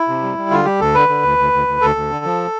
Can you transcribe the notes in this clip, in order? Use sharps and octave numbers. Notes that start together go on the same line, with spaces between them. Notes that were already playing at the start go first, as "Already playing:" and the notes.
Already playing: E4
C3
G3
G3
D3 F4
G3 G4
D2 A4
D3 B4
D3
D2
D2
D2
D2
D2 A4
D2
D3
F3